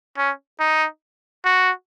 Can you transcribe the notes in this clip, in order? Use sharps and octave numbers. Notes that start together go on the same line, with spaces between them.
C#4
D#4
F#4